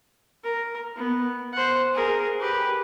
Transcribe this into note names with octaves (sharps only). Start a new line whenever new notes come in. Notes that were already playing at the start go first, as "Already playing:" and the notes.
A#4
B3
C5 F#5
G#4 A#4
G4 B4